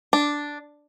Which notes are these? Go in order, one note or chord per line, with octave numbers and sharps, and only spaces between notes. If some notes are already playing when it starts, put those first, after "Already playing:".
D4